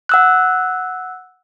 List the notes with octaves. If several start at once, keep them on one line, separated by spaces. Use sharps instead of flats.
F#5 E6 F#6